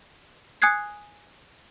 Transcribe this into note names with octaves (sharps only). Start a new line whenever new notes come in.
G#5 D#6 F#6 G#6 C7